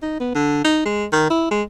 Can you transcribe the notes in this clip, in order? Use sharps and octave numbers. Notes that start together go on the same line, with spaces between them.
D#4
B3
D3
D#4
G#3
D#3
E4
G#3